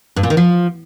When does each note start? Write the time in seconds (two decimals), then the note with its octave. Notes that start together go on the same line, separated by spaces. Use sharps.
0.16 G2
0.23 A#2
0.30 D#3
0.37 F3